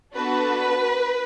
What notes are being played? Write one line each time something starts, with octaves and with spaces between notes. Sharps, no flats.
B3 D4 F#4 A4 B4